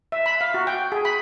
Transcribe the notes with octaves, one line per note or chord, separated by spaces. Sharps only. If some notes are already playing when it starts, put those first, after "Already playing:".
E5
B5
F5
F#4
G5
G#4
B5